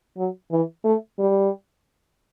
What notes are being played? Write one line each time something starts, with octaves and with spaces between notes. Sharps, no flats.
F#3
E3
A3
G3